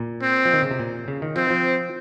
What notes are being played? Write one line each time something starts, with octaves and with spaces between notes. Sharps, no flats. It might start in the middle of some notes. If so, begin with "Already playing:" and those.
Already playing: A#2
C4
F3
D#3
C#3
C3
A#2
C#3
D#3
F3 C4
F3